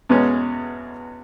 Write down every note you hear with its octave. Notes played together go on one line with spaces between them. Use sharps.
E2 B2 G#3 C#4